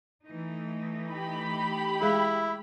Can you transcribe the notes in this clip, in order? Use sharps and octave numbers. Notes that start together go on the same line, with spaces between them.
E3 A3 D#4
G4 B5
G#3 E4 G#4